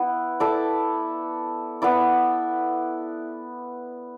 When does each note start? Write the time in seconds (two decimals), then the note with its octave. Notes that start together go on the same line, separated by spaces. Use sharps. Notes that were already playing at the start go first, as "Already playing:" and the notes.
Already playing: B3 E4
0.40 E4 A4 D5
1.82 B3 E4 D5